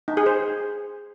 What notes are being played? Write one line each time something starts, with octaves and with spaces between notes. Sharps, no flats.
D#4
G#4
C5